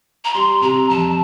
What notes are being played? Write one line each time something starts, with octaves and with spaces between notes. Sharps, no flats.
A#5
G3 C6
C3 A#5
F2 A5